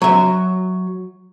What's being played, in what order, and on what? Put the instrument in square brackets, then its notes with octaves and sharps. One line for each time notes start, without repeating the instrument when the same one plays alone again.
[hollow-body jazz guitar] F#3 E5